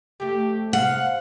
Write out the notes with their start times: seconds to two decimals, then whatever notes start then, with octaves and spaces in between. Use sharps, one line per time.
0.20 F2 A3 G4
0.73 C3 F5 F#5